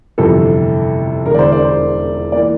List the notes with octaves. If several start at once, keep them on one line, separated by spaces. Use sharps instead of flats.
G1 F2 C3 E3 A4
E1 E2 D3 A#4
D5
C5
D5
C5
E3 A#3 D5